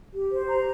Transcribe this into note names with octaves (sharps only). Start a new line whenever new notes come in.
G4
C5
A#5